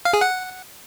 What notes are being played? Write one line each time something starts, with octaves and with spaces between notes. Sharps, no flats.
F5
G#4
F#5